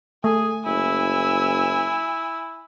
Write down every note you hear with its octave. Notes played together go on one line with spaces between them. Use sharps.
A3 G#4 G#5
F#1 E4 G#5 E6